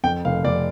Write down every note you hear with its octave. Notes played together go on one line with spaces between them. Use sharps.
F2 G5
F1 F5
F1 D5